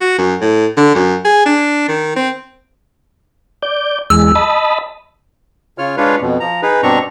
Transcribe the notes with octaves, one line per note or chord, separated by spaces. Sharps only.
F#4
F#2
A2
D3
F#2
G#4
D4
D#3
C4
D5 G6
E2 G#3 E6
D#5 A5 B5
C#3 F4 C#5 F6
G#3 D4 F4 B4 C#5 F5
F2 B2
F3 A#5
D#4 G#4 B4
G2 B2 C4 D4 A#5 C#6